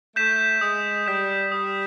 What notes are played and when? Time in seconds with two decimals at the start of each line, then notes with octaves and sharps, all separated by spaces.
0.16 A3 G6 B6 E7
0.61 G#3 D#6
1.06 G3 G6 B6 E7
1.52 G3 D#6